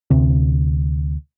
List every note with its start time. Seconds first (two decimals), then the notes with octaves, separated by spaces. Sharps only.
0.10 D2 C3 C4